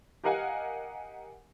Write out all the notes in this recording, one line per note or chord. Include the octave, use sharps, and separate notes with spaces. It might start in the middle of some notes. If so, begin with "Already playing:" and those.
G4 A#4 D#5 F5 F#5 G#5